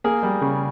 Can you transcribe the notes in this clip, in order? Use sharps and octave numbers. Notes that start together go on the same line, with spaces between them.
A#3 G#4 A#4
G3
C#3